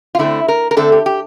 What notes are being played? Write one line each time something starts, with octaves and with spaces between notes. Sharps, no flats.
F4
D3 A3 C4 E4
A#4
A#4
D3 A3 C4 A4
G4
G4